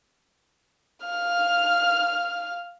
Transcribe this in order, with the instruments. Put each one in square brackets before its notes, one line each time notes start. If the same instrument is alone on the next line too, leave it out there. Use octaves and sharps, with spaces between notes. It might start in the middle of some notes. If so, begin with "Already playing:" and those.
[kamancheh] F5 F6